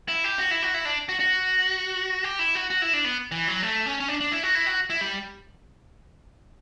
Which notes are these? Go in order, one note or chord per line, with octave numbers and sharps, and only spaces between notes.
E4
G4
F#4
E4
F#4
E4
D4
F#4
F#4
G4
E4
F#4
F#4
E4
D4
B3
E3
F#3
A3
C#4
C#4
D4
D4
E4
F#4
E4
F#4
E4
G3